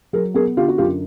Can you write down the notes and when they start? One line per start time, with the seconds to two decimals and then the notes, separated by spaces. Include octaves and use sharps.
0.13 F#3 G#4 A#4
0.34 B3 G#4 A#4
0.57 D3 F4 G4
0.68 F#4
0.78 F#2 F4 G4